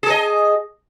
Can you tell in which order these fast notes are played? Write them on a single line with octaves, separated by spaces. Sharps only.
G#4 A4 D#5